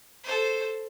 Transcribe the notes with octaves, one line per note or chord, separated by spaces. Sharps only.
A4 C5